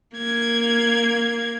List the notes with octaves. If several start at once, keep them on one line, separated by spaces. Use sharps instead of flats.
A#3 G#6